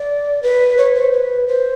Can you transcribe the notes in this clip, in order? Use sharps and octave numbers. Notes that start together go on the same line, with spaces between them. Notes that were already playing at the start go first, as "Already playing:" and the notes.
Already playing: D5
B4
C#5
C5
B4
C5